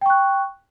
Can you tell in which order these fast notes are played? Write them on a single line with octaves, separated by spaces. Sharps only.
G5 C#6 F#6